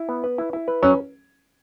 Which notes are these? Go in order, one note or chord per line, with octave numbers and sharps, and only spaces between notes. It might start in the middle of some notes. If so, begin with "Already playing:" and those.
Already playing: E4
B3
B4
E4
E4
B4
F#3 C#4